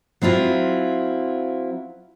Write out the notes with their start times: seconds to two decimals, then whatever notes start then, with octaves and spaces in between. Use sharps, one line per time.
0.22 F#3 C4 E4 F4